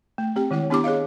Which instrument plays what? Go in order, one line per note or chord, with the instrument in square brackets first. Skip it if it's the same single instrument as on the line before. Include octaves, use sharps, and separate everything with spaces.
[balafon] A3
C4 G4 G5
D#3 G#3 E4 C#5
B3 D4 E4 G4 A#5 D6
G#4 C#5 D#5 F5